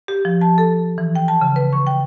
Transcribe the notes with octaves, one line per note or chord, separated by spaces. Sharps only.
G4
F3
A5
A4
E3
G5
A5
C#3
B4
C#6
G5